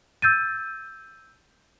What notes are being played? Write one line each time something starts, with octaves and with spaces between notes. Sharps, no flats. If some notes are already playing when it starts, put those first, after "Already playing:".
E6 G6 A6 D#7